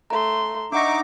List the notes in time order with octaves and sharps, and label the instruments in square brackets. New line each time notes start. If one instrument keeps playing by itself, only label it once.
[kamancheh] A3 C6 [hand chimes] A#5
[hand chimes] D4 F#5 A#6 [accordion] D#4 D6 [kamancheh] E5 C#6